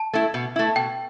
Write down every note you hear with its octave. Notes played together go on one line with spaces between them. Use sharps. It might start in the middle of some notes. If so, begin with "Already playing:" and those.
Already playing: A5
A3 E4
B2
A3 E4
B2 G5